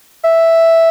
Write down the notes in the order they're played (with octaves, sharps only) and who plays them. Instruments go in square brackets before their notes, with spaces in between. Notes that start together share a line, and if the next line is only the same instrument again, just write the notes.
[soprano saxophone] E5